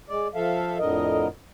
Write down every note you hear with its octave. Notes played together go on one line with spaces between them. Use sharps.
G#3 D5
F3 A4 E5 F5
F2 A2 D3 A#4 D#5